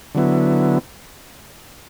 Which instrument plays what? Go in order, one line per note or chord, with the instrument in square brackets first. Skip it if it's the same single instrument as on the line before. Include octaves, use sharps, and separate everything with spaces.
[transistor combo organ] D3 F#3 B3 E4